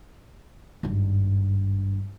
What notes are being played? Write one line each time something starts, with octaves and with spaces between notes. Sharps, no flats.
G#1 G2